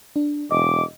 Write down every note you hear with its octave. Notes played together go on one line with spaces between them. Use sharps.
D4
E1 D#5 D6